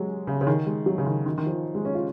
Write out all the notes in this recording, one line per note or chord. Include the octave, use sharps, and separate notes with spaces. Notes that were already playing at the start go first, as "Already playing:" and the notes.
Already playing: F#3 G#3
C#3
C#3
D#3
G#3
F#3
C#3
D#3
D#3
D#3
F3
G#3
C#4
F4